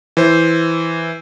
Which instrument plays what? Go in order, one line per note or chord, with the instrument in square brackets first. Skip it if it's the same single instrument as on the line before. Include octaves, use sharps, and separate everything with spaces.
[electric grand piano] E3 C5